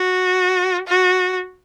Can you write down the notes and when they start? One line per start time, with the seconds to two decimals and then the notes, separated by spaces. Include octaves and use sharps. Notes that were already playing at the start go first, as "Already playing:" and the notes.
Already playing: F#4
0.87 F#4